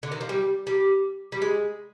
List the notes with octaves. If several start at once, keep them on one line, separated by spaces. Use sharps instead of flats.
D3
D#3
F3
G3
G3
G3
G#3